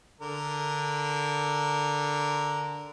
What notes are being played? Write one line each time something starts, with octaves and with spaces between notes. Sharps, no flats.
D3 A#4